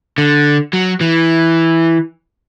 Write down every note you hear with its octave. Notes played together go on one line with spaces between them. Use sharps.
D3
F#3
E3